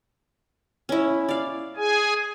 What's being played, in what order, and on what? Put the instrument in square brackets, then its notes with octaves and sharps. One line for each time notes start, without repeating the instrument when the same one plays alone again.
[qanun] C#4 E4
D5 F5
[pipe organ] G#4 G#5